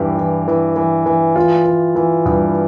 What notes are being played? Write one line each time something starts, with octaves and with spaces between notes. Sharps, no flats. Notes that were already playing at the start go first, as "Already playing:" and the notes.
Already playing: G2 E3 G4
E3
E3
E3
E3
E3 F4
E3
E3
G2